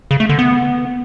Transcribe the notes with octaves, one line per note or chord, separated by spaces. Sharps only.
C#3
A3
D3
B3